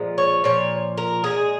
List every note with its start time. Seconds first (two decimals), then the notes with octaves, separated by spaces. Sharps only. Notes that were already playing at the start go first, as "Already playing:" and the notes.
Already playing: A#2 F3 G#3
0.18 C#5
0.44 A#2 F3 C#5
0.98 A#4
1.24 A#2 F3 G#3 G#4